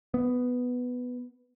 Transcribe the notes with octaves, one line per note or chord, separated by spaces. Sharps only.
B3